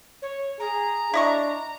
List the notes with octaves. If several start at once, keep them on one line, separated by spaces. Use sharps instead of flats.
C#5
G#4 A#5
D4 E4 D#5 C#6